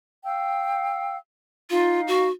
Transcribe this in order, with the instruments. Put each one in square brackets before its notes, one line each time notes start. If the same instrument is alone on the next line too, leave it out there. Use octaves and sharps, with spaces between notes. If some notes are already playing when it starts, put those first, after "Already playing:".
[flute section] F5 G5 E6
[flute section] D#4 F5 [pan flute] F4
[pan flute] F#4